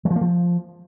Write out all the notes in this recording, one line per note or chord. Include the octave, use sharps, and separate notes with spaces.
F#3
F3
A#3
F3